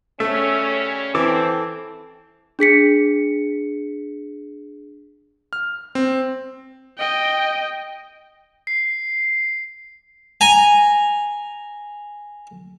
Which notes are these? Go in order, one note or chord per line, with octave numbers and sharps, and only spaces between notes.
C#3 G3 A3 C#4 E5
E3 C4 A4 D6
D4 G#4 B6 C#7
F6
C4
D#5 G5
C7
G#5 A#5